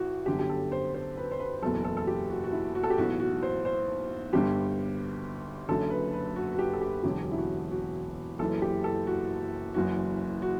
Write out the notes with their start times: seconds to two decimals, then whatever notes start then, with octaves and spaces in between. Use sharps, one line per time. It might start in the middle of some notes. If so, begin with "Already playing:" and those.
Already playing: A1 E3 F#4
0.26 G1 F#2 D3 F#3 G4
0.39 G4
0.49 A4
0.72 C5
0.94 C5
1.17 B4
1.31 C5
1.40 B4
1.62 F#1 E2 B2 F#3 A4
1.84 A4
1.97 A4
2.07 G4
2.30 F#4
2.44 F#4
2.52 E4
2.75 F#4
2.83 A4
2.90 G4
2.98 B1 A2 E3 F#4
3.20 F#4
3.43 C5
3.65 C5
4.33 G1 G2 D3 G4
5.69 F#1 F#2 D3 F#3 A4
5.90 B4
6.13 B4
6.36 F#4
6.53 F#4
6.59 G4
6.73 A4
6.81 G4
7.03 E1 E2 D3 F#3 G4
7.31 E4
7.38 F#4
7.71 F#4
8.39 F#1 F#2 E3 A4
8.62 G4
8.84 A4
9.07 F#4
9.74 F#1 F#2 E3 F#4
10.42 F#4